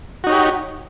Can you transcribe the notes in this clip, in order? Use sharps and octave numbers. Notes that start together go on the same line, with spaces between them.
D#4 F#4 G4 C#5